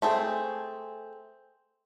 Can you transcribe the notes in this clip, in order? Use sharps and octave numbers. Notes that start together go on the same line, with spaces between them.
A3 C4 G#4